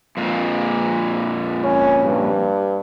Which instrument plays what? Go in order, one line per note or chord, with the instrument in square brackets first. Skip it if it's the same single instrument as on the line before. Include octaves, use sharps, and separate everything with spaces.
[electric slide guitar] F2 A#2
[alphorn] C#4
G2